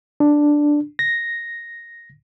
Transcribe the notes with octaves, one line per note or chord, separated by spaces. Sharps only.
D4
A#6